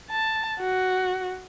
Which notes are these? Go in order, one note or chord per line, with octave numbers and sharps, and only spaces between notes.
A5
F#4